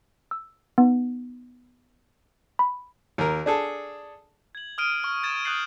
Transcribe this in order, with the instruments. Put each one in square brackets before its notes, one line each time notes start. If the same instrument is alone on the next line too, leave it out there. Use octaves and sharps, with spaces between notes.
[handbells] E6
B3 D#4
B5
[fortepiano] D#2 A#4
D4 G#4 A4
[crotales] G#6 F#7
D#6 F6 D7 D#7
C#6 F6
G#6 A6 E7
D#6 F#6 G6 A6 C7 F#7